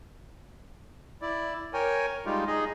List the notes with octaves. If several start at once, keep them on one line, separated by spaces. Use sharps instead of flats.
E4 D5
A#4 C#5 G5 G#5
G3 G#3 D#4 F4 G4
D#4 G#4 D#5